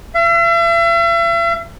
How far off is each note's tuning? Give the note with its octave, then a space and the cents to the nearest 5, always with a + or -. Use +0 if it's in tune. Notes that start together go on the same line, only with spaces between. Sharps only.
E5 +40